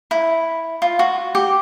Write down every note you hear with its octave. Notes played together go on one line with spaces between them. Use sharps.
E4
F4
F#4
G4